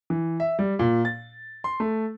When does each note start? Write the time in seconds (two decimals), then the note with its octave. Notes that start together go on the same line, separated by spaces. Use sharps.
0.10 E3
0.40 E5
0.59 G3
0.79 A#2
1.05 A6
1.64 C6
1.80 A3